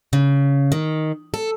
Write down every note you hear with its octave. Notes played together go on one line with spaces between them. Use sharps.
C#3
D#3
A4